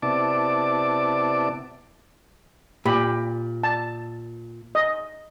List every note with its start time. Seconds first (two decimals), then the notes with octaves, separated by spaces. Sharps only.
0.02 C3 B3 E4 D5 A5 D6
2.86 A#2 G4 B5
3.63 A5
4.75 D#5